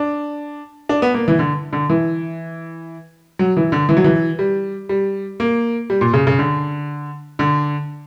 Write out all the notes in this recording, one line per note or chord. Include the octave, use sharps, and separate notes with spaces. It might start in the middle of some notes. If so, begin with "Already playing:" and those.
Already playing: D4
D4
B3
A#3
E3
D3
D3
E3
F#3
E3
D3
E3
F#3
E3
G3
G3
A#3
G3
A#2
C#3
C#3
D3
D3